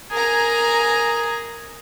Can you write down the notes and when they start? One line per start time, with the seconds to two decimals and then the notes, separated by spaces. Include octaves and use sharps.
0.11 G#4 A#4 G#5 A#5